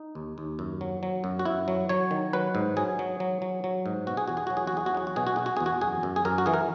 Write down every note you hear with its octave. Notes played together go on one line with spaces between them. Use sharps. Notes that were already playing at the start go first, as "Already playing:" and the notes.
Already playing: D#4
D#2
D#2
F#2
F#3
F#3
F#2
F#4
F#2 E4
F#3
F#3 C#5
D#3
F#3 B4
G#2
F#3 G#4
F#3
F#3
F#3
F#3
G#2
B2 F#4
G#4
E2 F#4
G#4
F#3 F#4
G#4
F#4
E2 G#4
F#4
F#3 G#4
F#4
B2 G#4
F#4
B2 G#4
F#4
E2 G#4
F#4
F#2 G#4
F#2
G#4
F#2 A#4
F#4
E3 G#4
A#4